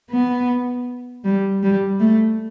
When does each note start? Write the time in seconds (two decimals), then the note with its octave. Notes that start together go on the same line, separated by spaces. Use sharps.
0.11 B3
1.25 G3
1.63 G3
2.00 A3